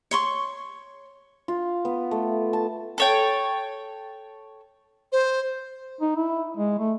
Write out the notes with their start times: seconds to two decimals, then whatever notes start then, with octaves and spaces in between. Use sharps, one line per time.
0.11 C#5 C6 C#6
1.48 F4
1.85 B3
2.11 A3
2.53 A5
2.98 A4 C#5 G5
5.12 C5
6.01 D#4
6.17 E4
6.57 G#3
6.79 A3